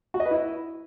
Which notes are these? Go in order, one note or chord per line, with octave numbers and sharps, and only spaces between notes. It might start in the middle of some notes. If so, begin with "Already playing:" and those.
F#4
D#5
B4
E4